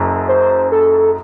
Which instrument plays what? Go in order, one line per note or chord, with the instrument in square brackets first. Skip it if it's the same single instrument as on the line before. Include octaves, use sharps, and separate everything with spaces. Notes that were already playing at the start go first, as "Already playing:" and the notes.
Already playing: [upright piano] F#1 F#2
[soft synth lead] C5
A4